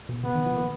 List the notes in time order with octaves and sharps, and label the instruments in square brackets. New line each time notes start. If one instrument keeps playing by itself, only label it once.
[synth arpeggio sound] B2
[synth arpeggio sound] C#3 [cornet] B3
[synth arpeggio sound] D#3
F3
A#3